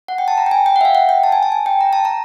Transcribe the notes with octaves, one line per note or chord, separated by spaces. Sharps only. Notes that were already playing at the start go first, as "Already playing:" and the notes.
F#5
G5
A5
A#5
G5
G#5
G5
F#5
E5
F5
F#5
G5
A5
G#5
A5
G#5
G5
A#5
A5
A#5